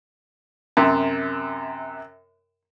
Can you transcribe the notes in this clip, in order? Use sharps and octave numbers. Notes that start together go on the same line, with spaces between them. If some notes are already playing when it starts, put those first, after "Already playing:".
F#2 C3